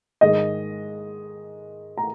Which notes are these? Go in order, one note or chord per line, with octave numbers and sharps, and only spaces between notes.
G#2 D#3 G#3 D#5
A#5